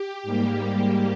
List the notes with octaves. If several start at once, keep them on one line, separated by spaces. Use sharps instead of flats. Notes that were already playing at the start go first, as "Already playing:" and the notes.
Already playing: G4
G#2 G3 A#3